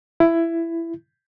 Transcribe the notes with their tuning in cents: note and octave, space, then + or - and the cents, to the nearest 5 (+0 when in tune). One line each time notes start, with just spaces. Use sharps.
E4 +15